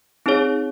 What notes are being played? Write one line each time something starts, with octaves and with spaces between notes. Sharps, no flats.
C4 D#4 G#4 C#5